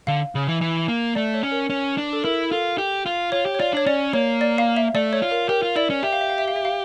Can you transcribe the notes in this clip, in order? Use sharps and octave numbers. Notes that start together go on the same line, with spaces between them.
D3 F5
C#3
E3
E3
A#3
A3 D5
C#5
C#4
A#4
C#4
D4
A4
E4 A#4
F4 A4
G4
F4
F4 C#5
G4
C#5
F4 D5
D4 C#5
C#4 D5
A#3 C#5
D5
F5
E5
A3 D5
C#5
F4
A#4
G4 A#4
F4
E4 D5
C#4
G4 E5
F5
E5
F5
E5
F5
E5
F5